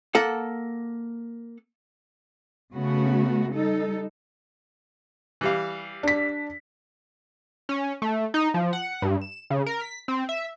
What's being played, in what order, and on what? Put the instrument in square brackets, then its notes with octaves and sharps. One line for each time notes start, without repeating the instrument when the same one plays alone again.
[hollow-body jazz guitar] A#3 A4 F#5
[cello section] C#3 A3 B3 F#4
G3 D#4 A4
[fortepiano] E3 G3 F5
[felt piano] D4 B6
[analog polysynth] C#4
A3
D#4
F3
F#5
G2
E7
C#3
A#4
B6
C4
E5